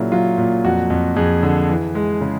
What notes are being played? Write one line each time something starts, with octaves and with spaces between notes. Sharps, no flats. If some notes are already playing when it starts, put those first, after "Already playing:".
Already playing: A#2 C#3 F#3 E4
F#3 F4
A#2
F2 F#4
F2
F2 G#4
D3
E3
G#3
C#3